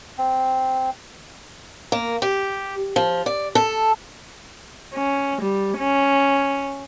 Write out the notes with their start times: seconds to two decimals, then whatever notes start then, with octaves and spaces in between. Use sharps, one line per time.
0.18 C4
1.92 A#3
2.22 G4
2.96 F3
3.26 D5
3.55 A4
4.94 C#4
5.41 G3
5.78 C#4